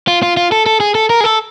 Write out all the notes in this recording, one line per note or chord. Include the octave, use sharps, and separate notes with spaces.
F4
F4
F4
A4
A4
G#4
A4
A#4
G#4
A4